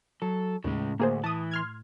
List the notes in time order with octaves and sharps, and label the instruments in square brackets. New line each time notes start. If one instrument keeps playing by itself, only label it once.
[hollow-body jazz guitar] F#3 [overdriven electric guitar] A4
[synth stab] D#2 [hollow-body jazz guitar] A2 [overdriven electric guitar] C#3 G#3
[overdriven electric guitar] D2 [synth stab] A#3 G#4 C5
[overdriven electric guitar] E3 [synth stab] A5 D#6
[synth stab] C6 F6 G#6